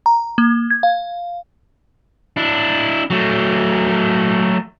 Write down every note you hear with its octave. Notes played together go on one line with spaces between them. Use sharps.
A#5
A#3
G#6
F5
D4 E4
F#3 A3